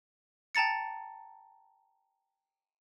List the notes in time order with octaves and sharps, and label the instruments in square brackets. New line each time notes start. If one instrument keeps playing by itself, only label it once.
[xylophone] G5 A5 A#5 A6 C#7